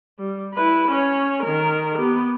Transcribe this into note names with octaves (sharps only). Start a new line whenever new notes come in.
G3
E4 B4
C#4 C#5
D#3 A#4
B3 G4